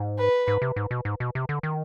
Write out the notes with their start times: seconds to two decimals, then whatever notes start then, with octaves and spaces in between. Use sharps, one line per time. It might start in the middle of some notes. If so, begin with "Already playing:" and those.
Already playing: G#2
0.18 B4
0.48 G#2
0.62 C3
0.76 G#2
0.91 B2
1.05 G#2
1.20 B2
1.35 C3
1.49 D3
1.63 D#3